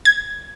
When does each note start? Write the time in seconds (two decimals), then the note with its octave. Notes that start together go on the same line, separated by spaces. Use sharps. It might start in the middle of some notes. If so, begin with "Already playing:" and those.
0.05 G#6